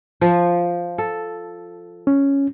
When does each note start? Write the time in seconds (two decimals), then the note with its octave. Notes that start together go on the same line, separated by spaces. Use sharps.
0.21 F3
0.98 A4
2.07 C#4